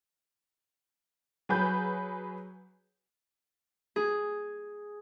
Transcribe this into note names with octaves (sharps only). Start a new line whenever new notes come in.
F#3 G#4 B4 G6
G#4